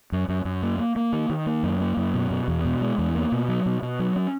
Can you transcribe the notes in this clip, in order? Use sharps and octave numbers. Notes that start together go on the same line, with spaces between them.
F#2
F#2
F#2
A#3
A#3
A#3
D#3
D#3
A#3
F#2
A#3
F#2
B2
B2
E2
B2
G#3
E2
A#3
B2
F#3
B2
B2
F#3
C#4